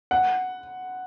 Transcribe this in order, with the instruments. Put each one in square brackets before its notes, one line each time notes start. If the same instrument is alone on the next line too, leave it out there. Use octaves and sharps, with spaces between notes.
[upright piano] F#5